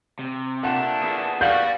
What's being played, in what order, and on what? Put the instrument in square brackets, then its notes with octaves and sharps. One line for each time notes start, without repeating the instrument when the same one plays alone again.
[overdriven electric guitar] C3
[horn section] A#2 A3 D4 [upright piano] F#5 [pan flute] A5
[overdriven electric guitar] B3 G#4
[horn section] E3 G3 F#4 [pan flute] D5 [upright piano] F5 G6